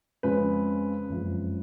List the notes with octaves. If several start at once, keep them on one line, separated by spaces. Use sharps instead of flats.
F2 C#3 G#3 B4
F#1 F2 F3 G#3